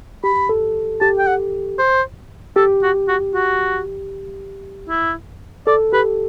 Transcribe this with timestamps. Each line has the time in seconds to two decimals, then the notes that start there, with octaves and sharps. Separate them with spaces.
0.24 G4 B5
0.49 A4
1.01 G4 A5
1.18 G5
1.27 F#5
1.78 C5
2.56 G4 A4
2.83 F#4
3.08 F#4
3.34 F#4
4.89 E4
5.67 A4 D5
5.93 G4 B4